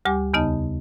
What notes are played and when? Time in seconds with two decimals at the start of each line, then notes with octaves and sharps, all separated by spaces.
0.05 D2 G3 G4 G#5 D6
0.34 E2 C#3 B3 D#4 D#5 A5